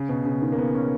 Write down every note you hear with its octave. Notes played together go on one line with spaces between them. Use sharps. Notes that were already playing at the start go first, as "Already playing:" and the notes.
Already playing: C#3
B2
C#3
D#3
A#3
B3
C#4